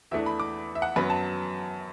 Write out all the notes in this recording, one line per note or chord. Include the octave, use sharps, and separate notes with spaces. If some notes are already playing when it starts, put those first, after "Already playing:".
E2 E3 A3 D4 E5
B5
D6
E5
F#5
F#2 F#3 B3 B5
A5